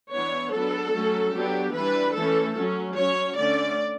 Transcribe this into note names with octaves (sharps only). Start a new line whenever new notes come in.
E3 B3 D4 C#5
F#3 B3 D4 A4
F#3 A3 C#4
F#3 B3 D4 G4
E3 G3 D4 B4
E3 A3 C#4 A4
F#3 C#4
F#3 C#4 C#5
D3 A3 C#4 D5